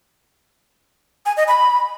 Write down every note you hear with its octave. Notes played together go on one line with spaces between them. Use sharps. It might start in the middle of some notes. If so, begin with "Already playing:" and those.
G#5
D#5
B5